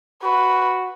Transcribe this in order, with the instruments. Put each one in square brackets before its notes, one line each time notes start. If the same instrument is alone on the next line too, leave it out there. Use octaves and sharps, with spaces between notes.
[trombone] F#4 [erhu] B4